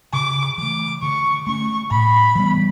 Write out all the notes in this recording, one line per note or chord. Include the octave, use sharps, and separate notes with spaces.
C#3 D6
E3 A3 D6
D3 C#6
A3 C#4 C#6
A2 B5
E3 G3 B3